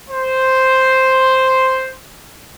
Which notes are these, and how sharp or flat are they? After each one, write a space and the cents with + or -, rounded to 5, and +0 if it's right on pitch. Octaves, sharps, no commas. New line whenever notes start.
C5 +0